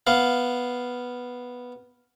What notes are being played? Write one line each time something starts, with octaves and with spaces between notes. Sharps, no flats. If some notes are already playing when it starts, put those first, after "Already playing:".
B3 F5